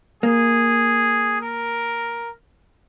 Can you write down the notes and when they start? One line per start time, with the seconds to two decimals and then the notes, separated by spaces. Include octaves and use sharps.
0.23 A#3 G#4
1.41 A#4